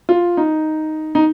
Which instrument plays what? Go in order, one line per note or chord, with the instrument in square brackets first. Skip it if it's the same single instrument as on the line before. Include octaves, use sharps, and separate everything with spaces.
[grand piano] F4
D#4
D#4